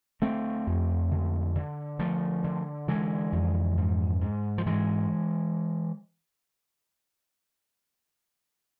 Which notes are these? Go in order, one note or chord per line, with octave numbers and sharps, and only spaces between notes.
D3 A3 C4
F2
D3
D3
D3 F3 A3
D3
D3 E3 G#3
F2
G#2
G#2
F3
G#2 E3 G#3